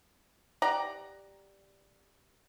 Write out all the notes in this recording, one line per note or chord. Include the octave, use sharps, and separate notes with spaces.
G4 D5 F#5 A#5